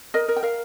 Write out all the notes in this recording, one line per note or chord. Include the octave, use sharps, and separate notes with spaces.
A#4 D#5
A#4
G5
A#4 F5